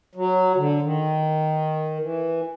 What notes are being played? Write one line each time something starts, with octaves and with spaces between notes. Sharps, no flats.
F#3
D3
D#3
E3